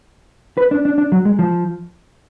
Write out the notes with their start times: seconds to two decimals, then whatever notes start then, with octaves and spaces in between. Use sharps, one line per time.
0.57 B4
0.71 D4
0.85 D4
0.98 D4
1.12 F#3
1.25 G#3
1.39 F3